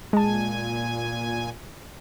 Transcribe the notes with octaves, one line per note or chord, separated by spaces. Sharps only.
A#2 G#3 G#5 A5